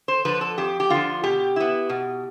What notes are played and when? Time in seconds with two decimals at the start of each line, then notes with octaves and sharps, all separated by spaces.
0.08 C5
0.25 D3 F3 B4
0.41 A4
0.58 F2 G4
0.80 G4
0.90 D3 F3 F4
1.24 B2 G4
1.56 B3 E4
1.89 B2